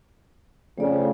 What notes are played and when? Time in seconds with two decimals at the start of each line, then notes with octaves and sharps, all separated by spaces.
0.78 F2 C#3 A3 D5